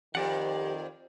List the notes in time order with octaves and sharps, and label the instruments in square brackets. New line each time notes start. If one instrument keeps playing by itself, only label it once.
[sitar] F2 [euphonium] D#3 [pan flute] G4 [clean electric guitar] C5 D5 F#5